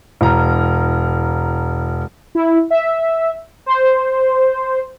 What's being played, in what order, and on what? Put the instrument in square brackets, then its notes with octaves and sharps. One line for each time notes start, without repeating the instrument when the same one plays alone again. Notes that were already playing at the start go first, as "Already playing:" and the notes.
[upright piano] E1 A#5
[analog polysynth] E4
E5
C5